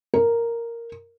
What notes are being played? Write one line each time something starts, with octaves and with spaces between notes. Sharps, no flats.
A#4